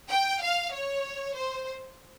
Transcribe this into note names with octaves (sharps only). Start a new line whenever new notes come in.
G5
F5
C#5
C5